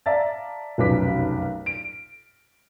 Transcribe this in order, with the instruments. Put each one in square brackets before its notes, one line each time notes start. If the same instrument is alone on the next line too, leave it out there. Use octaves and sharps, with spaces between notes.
[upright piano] D5 E5 F5 A5 A#5 A6
F1 B1 F#2 B4 D6 B6
D7